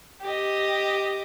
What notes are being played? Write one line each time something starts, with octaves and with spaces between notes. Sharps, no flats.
G4 D#5